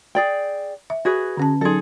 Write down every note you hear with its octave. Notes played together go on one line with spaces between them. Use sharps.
G#4 D5 G5
E5
F#4 G#4 B4
D3 C#4 A5
F#3 D#4 G#4 A4